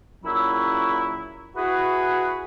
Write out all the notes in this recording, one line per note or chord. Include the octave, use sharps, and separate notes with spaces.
A#2 C#3 F#3 C#4 E4
E4 F#4 G#4 B4